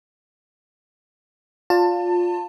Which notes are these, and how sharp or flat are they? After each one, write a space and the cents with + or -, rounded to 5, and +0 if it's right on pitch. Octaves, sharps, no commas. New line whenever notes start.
F4 +15 D5 -30 A5 +25